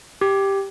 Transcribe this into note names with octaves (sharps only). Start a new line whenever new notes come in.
G4